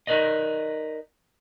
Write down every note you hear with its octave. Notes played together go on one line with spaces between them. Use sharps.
D#4 A#4 B4 D5 D#5